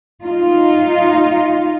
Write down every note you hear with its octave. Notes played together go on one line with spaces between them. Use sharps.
D#4 F4